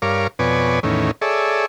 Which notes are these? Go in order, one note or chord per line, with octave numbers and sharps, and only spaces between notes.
G2 A#4 C#5 F5 D6
F2 B2 B4 C#5 D5 G#5
E2 A2 D#3 C#4
G#4 A4 C#5 D5 E5